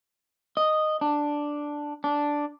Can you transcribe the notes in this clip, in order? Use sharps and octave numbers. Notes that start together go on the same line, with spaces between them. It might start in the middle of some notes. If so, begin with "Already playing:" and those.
D#5
D4
D4